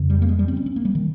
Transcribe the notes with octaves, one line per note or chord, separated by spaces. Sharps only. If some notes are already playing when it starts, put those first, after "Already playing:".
Already playing: F2 C#3
G3
A#3
G#3
G3
C4
C#4
C4
A#3
G3
D#3